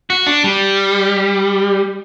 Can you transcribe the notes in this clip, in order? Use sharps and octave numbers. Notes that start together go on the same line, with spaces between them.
F#4
D4
G3